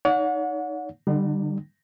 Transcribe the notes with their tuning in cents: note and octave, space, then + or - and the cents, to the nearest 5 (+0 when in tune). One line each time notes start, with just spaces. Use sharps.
D#4 +0 C#5 +45 F#5 -30
D3 +15 G3 +0 D#4 -45